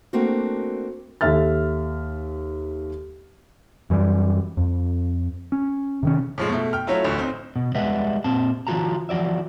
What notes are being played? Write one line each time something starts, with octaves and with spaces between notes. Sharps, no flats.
A3 A#3 C4 D4 F#4
D#2 A4 E5 F6 A6
F#2 E3 F3 G3
F2
C#4
C3 D#3 C#4
A2 F3 G#3
B2 A3
G5 F6
F#3 A3 C#4 E4 F4
A1 D2
C4 D#4
B2
G3 G#3 B4 D#5 E5 F#5
A#2 C4 A5
E3 C#4 F4 F#4 A5 A#5
E3 F3 F#4 D5 E5